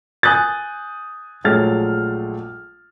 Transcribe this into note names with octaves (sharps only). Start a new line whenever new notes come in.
G#5 D#6 F#6 G6 A6
A#1 F#3 G#3 A3 F6 A6